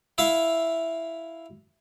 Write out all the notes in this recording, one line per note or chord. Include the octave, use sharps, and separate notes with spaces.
E4 E5 F5